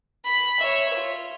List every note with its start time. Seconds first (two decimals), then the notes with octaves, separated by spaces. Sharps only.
0.25 B5
0.60 C#5 E5
0.94 F4